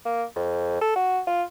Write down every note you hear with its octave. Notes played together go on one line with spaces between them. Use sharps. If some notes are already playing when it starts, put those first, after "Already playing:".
A#3
F2
A4
F#4
F4